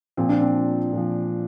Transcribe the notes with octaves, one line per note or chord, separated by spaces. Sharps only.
A#2 F3 C4
D4
C4
A#2 F3